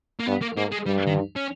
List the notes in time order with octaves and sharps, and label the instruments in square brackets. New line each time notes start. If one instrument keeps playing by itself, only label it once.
[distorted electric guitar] A#3
[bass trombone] G2 [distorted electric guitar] B3
[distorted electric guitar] A#3
[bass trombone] G#2 [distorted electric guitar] A#3
[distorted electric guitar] G#3
[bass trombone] G2 [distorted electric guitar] G3
[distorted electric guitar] D#3
C#4